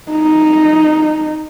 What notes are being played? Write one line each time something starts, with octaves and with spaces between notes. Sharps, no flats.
D#4